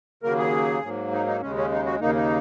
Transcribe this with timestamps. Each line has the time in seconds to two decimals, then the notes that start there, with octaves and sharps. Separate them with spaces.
0.23 D#2 C#3 F#3 A#3 A#4
0.38 G#4
0.82 G#2 F#3 A#3
1.12 D#4
1.27 D#4
1.41 D#2 C#3 G#3 C#4
1.56 C#4
1.71 D#4
1.85 F#4
2.00 D#2 C#3 A#3 D#4
2.15 D#4